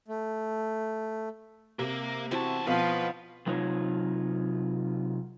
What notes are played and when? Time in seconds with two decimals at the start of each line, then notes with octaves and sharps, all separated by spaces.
0.08 A3
1.79 C3 A#3 A#4
2.31 E2 C4 E4 F#4 A5
2.67 B2 F3 B4 F5
3.47 C3 F#3 D#4 F4 B4 C#5